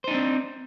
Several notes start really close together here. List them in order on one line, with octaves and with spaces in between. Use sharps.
C5 D#4 D4 C4